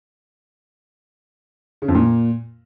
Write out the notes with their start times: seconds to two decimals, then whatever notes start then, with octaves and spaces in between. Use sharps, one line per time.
1.82 C#3
1.88 F2
1.95 A#2